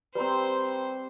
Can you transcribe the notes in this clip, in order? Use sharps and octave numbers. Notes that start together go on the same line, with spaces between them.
G3 C4 B4 C5 A#5